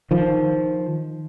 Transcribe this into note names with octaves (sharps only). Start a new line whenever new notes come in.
D#3 F3